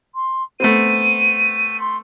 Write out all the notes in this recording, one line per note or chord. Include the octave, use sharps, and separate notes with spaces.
C6
A3 B3 C4 D#7
C6